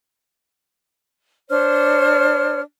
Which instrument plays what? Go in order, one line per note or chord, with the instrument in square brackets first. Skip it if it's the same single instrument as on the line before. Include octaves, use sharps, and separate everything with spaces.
[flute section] D4 C5 C#5 F6